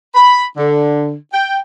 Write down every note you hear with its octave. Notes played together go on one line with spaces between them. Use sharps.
B5
D3
G5